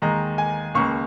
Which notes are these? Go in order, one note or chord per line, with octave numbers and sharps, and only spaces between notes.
D#2 D#3 G#3 A#5
G#5
C#2 C#3 A#3 C#6